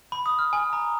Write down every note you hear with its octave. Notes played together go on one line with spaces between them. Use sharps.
B5
D#6
F6
G#5
A#5